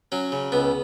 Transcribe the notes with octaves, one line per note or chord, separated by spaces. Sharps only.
F#3 C#4
C#3
C#2 B3